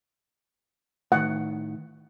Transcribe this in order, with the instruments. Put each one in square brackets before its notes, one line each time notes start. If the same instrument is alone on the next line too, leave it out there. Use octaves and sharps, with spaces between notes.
[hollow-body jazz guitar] A2 D#3 [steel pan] F#5